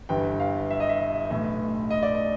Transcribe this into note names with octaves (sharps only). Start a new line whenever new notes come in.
G1 G2 E3 G5
F5
E5
D#5
E5
B1 A2 E3
D#5
D5
D#5